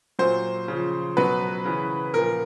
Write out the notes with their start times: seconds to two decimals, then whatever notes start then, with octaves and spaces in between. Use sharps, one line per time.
0.19 A#2 F#3 C5
0.68 C#3 F3
1.17 B2 F#3 B4
1.65 C#3 E3
2.14 A#2 F3 A#4